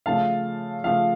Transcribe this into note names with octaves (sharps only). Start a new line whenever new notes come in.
C#3 F3 A3 F5 A5
C#3 F3 A3 F5